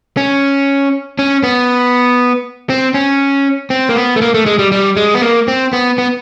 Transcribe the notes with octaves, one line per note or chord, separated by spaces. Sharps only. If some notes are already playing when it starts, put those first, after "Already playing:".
C#4
C#4
B3
C4
C#4
C4
A#3
B3
A3
A#3
A3
G#3
G3
G3
G#3
B3
A#3
C4
B3
B3